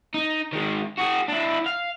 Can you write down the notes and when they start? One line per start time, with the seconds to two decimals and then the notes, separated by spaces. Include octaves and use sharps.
0.14 D#4
0.53 D#3 G#3
0.98 F#4 G#4
1.28 D4 E4
1.66 F5